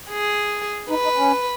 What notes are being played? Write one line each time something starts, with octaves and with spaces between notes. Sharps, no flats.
G#4
D#4 B4
D#4
C#4